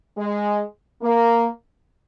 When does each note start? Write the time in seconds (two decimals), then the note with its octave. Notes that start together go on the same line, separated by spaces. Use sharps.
0.17 G#3
1.02 A#3